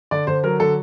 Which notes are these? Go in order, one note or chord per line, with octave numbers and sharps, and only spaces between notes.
D3 D5
D3 C5
F#3 A#4
D3 A4